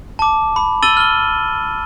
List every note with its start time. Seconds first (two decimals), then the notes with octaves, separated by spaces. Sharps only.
0.19 A5 D6
0.56 B5
0.83 E6 A6 D#7 F#7 G7
0.97 F6 G7